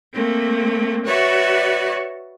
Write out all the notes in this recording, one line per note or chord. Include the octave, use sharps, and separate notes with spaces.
A3 A#3 C4
F#4 B4 C#5 D5 E5